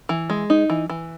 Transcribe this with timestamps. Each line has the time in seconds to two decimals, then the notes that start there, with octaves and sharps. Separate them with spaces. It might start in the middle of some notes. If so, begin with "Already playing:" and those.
0.09 E3
0.30 G#3
0.50 D#4
0.70 E3
0.90 E3